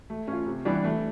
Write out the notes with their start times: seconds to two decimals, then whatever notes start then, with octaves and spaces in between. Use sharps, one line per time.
0.10 A3
0.27 C#4 F4
0.46 C3
0.65 E3 G3 B3 D4
0.84 A3